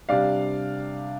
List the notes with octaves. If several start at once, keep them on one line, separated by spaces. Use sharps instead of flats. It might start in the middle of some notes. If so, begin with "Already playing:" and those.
C3 G3 D4 D5 F5